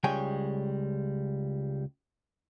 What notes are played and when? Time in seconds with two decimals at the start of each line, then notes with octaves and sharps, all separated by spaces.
0.04 C#2 G3 G#3 C#5 G5 G#5